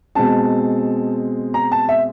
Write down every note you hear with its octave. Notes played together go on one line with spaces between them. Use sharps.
B2 G#3 C4 A5
A#5
A5
E5